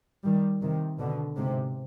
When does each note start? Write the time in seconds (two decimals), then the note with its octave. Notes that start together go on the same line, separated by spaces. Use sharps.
0.25 D#3 G3
0.62 C3 D#3
0.99 B2 D3
1.37 G#2 C3